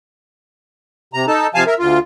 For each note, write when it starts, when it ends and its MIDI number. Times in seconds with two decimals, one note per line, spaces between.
1.14 1.26 48
1.14 1.26 82
1.28 1.47 63
1.28 1.47 69
1.28 1.47 81
1.55 1.64 48
1.55 1.64 53
1.55 1.64 77
1.55 1.64 80
1.55 1.64 81
1.67 1.74 70
1.67 1.74 76
1.79 1.98 38
1.79 1.98 65